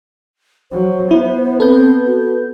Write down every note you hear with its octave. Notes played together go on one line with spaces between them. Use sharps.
F#3 C5
B3 E4
C4 A4 B4 G6
F#4